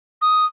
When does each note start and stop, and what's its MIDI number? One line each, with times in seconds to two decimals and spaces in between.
0.22 0.45 87